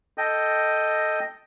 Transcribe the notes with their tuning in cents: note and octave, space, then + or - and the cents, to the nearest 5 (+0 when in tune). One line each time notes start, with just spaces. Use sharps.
A4 +0 D#5 +0 G5 +0